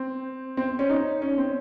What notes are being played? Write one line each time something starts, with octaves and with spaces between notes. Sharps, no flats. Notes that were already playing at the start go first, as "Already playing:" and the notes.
Already playing: C4
C4
C#4
D#4
C#4
C4